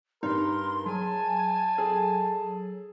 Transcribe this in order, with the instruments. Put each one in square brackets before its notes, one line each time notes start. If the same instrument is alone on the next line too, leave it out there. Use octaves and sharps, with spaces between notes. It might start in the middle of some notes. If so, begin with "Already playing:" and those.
[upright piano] G2 [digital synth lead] D#4 [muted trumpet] A#4 [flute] C6
[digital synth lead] F#3 [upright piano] G#4 [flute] G#5 [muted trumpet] A5
[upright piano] G#4 A4